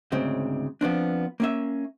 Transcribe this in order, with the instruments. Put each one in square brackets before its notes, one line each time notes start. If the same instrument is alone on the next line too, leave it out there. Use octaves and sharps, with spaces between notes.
[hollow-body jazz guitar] D2 G#2 C#3 C4
F3 B3 C4 D4
A#3 C#4 E5